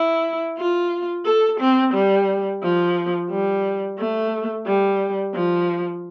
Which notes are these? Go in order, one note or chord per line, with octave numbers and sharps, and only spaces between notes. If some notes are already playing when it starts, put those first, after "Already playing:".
Already playing: E4
F4
A4
C4
G3
F3
G3
A3
G3
F3